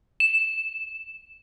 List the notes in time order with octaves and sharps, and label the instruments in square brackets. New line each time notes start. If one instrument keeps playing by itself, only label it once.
[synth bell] E7